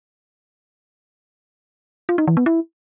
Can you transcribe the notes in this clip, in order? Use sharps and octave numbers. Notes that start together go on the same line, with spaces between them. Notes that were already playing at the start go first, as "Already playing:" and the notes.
F4
D#4
E3
B3
E4